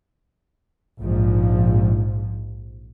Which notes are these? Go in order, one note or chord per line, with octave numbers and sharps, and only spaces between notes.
A#1 G#2 F3